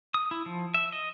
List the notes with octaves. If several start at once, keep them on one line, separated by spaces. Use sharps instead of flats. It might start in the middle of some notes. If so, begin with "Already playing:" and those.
D#6
E4
F3
E5
D#5